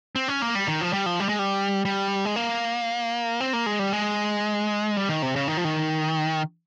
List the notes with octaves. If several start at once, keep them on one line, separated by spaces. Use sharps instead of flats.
C4
C#4
A#3
G3
D#3
F3
G3
F3
G3
G#3
G3
G3
G#3
A#3
C4
A#3
G#3
G3
G#3
G3
D#3
C3
C#3
D#3
F3
D#3